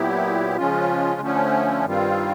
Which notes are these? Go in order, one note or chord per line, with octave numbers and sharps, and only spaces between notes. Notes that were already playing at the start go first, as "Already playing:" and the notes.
Already playing: A#2 F#3 B3 E4 G4
C#3 F3 G#3 C#4 F4
D3 F3 A3 C#4
G2 D#3 G3 C4 F4